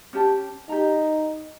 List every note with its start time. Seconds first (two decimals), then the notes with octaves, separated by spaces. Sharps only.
0.13 C#4 G4 A5
0.69 D#4 G4 A#5